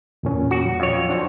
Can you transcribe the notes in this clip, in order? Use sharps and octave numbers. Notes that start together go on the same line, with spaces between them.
E2 A#2 C#4
F#4
F#3
F2 C#5
D4 F#4 C5